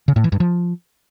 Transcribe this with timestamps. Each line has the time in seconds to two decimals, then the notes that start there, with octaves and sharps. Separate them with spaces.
0.08 C#3
0.16 A2
0.24 E3
0.32 G2
0.40 F3